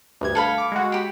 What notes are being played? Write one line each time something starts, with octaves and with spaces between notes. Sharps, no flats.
D2 G2 G#6
A4 F5 B5
D6
G#3 F#4
G4 B5